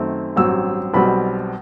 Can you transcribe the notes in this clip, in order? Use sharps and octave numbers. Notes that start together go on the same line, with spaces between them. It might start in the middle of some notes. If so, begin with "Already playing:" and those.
Already playing: F#2 D#3 A3 C4
A1 G2 F#3 C4 E6
B1 B2 G3 C4 B5